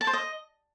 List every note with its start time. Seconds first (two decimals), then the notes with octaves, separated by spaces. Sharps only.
0.01 A5
0.07 C5
0.13 D#5